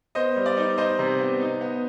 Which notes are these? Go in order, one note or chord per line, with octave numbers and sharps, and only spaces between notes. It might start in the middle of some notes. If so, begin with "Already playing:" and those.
B3 C5 D#5
G3
D5
D#4
D#4 C5 D#5
C3
B3
D#4
B3